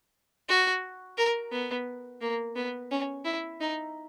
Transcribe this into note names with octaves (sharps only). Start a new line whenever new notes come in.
F#4
A#4
B3
A#3
B3
C#4
E4
D#4